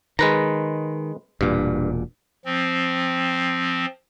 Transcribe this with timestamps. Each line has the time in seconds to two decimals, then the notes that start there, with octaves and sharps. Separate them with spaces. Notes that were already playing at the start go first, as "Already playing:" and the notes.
0.19 D#3 G#3 B4 A#5
1.41 E1 G2 A#2
2.45 F3 C4